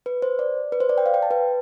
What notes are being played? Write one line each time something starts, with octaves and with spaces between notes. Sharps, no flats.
B4
C5
D5
B4
C5
D5
G5
F5
G5
A5
B4